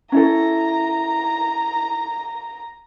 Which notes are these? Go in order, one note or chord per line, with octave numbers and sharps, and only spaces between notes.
C#4 E4 A4 A#5